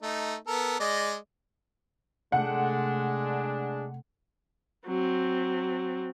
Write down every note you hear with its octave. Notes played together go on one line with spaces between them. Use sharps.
A3 D#4
B3 A4 A#4
G#3 D5 D#5
C3 G#3 A3 C4 D4 F#5
F#3 C4